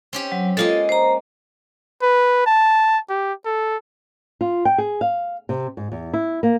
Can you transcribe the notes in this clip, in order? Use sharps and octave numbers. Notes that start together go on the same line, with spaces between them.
C4 C#4 G4
F#3
G#3 A#3 F4 A4 D#5
C5 A#5
B4
A5
G4
A4
F4
G5
G#4
F5
C3
G#2
E2
E4
A#3